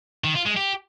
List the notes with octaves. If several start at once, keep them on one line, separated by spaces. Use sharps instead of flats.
D#3
F4
G#3
G4